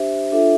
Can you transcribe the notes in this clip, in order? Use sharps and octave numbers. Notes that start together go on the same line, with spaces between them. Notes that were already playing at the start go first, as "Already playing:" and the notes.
Already playing: D4 G4 C5 E5
D4 F4 A4 E5